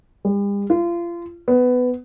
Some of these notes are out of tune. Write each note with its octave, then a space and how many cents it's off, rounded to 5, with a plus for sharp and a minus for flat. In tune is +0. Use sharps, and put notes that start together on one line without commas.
G3 +45
F4 -30
B3 +15